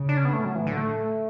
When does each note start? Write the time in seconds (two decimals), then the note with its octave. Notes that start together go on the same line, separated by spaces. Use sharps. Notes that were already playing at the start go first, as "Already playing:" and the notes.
Already playing: C#3
0.09 D4
0.17 C#4
0.25 B3
0.33 A2 A3
0.45 F#3
0.55 E3
0.67 D3
0.77 A3